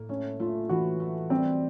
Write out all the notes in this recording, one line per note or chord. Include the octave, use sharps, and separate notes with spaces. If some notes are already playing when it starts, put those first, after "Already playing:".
Already playing: A2 A#3
A3 C#4
A3 F4
E3 F#4
A3
G3 C4